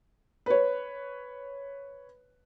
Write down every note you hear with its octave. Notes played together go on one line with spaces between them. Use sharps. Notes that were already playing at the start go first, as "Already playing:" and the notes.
B4 C#5